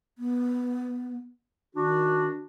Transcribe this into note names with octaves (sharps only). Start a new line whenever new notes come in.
B3
D#3 D4 F#4